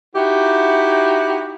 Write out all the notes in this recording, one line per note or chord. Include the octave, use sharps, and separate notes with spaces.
D#4 E4 F#4 G4